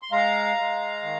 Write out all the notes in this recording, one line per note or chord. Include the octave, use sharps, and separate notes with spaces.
C6
G#3 F5 A#5
G#3
D#3